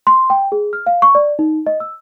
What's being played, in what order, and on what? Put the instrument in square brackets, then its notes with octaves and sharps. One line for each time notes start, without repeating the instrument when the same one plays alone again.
[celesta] C6
G5
G#4
F6
F5
C#6
D5
D#4
D#5
E6